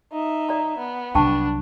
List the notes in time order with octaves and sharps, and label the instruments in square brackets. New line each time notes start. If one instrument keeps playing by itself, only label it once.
[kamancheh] D#4 E5
[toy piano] D5 A#5
[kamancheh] B3
[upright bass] C2 F#3 [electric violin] D4 [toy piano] G5 A5 C#6